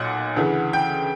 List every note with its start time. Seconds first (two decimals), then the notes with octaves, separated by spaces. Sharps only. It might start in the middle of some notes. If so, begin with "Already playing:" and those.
Already playing: B1 A#2 F#5
0.36 D2 C#3 E3
0.73 G5